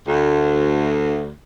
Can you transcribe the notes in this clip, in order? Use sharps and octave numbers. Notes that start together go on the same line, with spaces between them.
D2